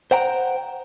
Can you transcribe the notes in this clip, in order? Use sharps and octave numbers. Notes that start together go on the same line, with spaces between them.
C5 F#5 G5 A#5